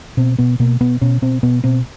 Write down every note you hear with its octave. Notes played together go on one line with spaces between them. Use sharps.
B2 C4
B2 B3
B2 A#3
B2 B3
B2 C#4
B2 C4
B2 B3
B2 C4